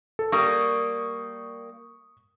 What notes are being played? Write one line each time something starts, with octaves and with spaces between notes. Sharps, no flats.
A4
G3 A#3 C#6 D#6